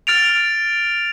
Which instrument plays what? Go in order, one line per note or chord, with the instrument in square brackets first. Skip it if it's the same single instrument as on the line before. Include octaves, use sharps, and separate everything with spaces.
[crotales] F6 A6 D7 F7